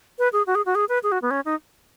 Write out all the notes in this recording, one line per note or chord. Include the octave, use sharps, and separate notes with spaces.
B4
G#4
F#4
G#4
F#4
G#4
B4
G#4
F#4
B3
C#4
D#4